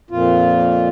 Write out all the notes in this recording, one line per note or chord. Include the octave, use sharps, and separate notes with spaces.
F2 A#2 F4